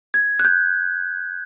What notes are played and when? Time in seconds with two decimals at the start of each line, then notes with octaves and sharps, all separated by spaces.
0.14 G#6
0.40 F#6
0.45 G6